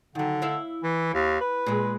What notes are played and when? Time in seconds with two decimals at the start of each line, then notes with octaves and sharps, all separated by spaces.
0.15 D3 D#3 F#3
0.42 E4 E5 F5
0.83 E3
1.14 D#2
1.41 B4
1.66 A#2 G#3